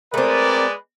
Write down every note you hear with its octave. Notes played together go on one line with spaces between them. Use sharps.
G#3 A3 C4 A#4 B4 D5